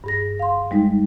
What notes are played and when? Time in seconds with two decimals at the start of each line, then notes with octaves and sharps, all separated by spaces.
0.04 G2 G#4 A#6
0.39 F5 C6
0.71 G3 G#3 D#4